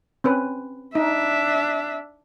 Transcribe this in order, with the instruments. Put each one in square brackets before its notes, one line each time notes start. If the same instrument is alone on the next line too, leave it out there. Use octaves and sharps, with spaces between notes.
[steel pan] C4 C#4 B4
[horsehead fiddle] D4 E5 [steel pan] D#4